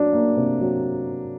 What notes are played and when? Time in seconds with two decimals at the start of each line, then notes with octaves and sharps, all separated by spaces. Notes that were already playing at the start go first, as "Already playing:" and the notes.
Already playing: F#3 D4
0.13 A#3
0.37 C3
0.60 F#3